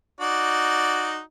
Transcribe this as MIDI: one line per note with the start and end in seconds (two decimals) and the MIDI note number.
0.21 1.20 63
0.21 1.20 66
0.21 1.20 74